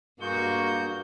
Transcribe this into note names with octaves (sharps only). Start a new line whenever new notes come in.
G2 G#3 A#3 F#4 C#6 G6